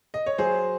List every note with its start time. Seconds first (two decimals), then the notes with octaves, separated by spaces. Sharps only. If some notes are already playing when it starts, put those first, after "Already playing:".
0.14 D#5
0.26 C#5
0.38 F#3 G#4 C5